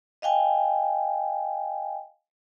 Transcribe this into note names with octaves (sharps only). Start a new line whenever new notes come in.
D#5 F5 G5 G#5